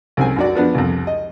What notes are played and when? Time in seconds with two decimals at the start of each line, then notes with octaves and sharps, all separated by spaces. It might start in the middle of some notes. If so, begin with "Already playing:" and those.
0.17 C2 C4 C#4 G#5
0.36 F#2 F#4 D5
0.55 F3 B3 D4
0.75 C2 F2
1.07 D#5